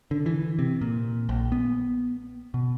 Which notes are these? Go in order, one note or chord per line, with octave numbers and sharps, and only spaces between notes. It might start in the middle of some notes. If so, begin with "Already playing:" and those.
D3
E3
C3
A#2
A#1
B3
B2